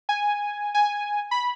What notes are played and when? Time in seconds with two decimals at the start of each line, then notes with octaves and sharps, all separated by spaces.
0.09 G#5
0.75 G#5
1.31 B5